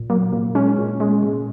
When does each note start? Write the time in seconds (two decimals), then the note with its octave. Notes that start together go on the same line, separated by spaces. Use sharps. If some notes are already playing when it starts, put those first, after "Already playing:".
Already playing: A#2
0.10 F#3 A#3
0.33 A#2
0.55 G#3 C#4
0.78 A#2
1.00 G#3
1.23 A#2